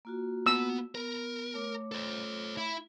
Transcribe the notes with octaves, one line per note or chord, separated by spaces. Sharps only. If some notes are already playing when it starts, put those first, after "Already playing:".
A#3 F4 F#4
B3 E6
B3 A#4
A3 C#5 D6
A4 C5
E4 E5